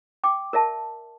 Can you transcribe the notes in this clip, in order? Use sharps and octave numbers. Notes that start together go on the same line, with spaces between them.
G5 D6
A#4 D5 E5 A5